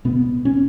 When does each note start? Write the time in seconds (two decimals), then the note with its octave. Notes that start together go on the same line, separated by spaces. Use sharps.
0.05 B2 B3
0.45 C#4